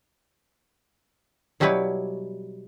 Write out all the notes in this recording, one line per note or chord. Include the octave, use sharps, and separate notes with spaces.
B2 F#3 G3 E4 B4 C#5